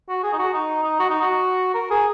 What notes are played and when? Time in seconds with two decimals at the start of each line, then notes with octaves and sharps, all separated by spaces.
0.09 F#4
0.23 G#4
0.33 D#4
0.39 F#4
0.54 D#4
0.84 D#4
1.00 F#4
1.10 D#4
1.21 F#4
1.75 A#4
1.90 G#4